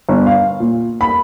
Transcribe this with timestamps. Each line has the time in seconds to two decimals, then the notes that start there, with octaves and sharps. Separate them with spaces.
0.09 G1
0.26 F5
0.60 A#2
1.01 B5